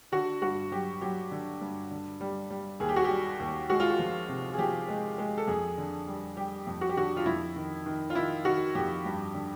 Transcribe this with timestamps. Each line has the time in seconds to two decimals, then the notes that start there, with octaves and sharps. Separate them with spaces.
0.12 D3 F#4
0.42 G2 F#4
0.72 F#3 G4
1.01 F#3 G4
1.31 D3
1.61 G2
1.91 D3
2.21 G3
2.50 G3
2.80 D#2 G#4
2.89 G4
2.96 F#4
3.05 G4
3.10 G3
3.40 D#2
3.70 G#3 F#4
3.80 F4
3.90 F#4
3.99 F3
4.29 C3
4.54 G#4
4.58 F3 G4
4.88 G#3
5.18 G#3
5.38 A4
5.48 F2 G#4
5.78 D3
6.07 G3
6.37 G3 G4
6.67 F2
6.81 F#4
6.89 G4
6.97 D3 F#4
7.17 F4
7.26 F2 E4
7.56 D#3
7.86 D#3
8.10 F4
8.15 D#3 E4
8.45 D#3 F#4
8.75 F2 G4
9.05 G2
9.34 D3